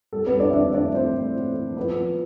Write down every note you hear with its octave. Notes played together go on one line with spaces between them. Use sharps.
G3 A4
B3 B4
G3
D4 D5
E5
C4 D4 D5
A2 D4 D5
A2 C4 C5
A2
C4
E3
F3 B3 B4
F3